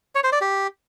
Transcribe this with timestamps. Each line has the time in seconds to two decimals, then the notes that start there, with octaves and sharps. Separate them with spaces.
0.15 C#5
0.24 C5
0.32 D5
0.41 G4